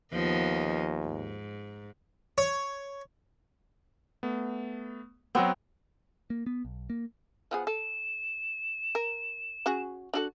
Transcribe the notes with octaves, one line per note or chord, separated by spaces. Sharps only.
D#2 F3 B3 D#5
G#2
C#5
A3 B3
F#3 B3 C4 F#4 E6
A#3
B3
B1
A#3
F3 B3 G#4 F#5
A4 E7
A#4
C#4 F#4 G#4
D4 F#4 A4 F#7